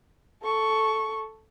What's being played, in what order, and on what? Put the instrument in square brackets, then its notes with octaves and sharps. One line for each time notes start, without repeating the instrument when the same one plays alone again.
[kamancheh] A4 C#6